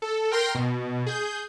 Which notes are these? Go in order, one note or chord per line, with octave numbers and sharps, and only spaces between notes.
A4
A#4 G5 C6 A#6
B2
G#4 G6